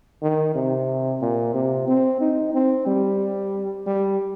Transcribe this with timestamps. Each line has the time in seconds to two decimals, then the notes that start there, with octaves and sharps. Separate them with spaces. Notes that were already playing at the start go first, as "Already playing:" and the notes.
0.22 D#3
0.55 C3
1.21 A#2
1.54 C3
1.88 C4
2.21 D#4
2.54 C4
2.87 G3
3.86 G3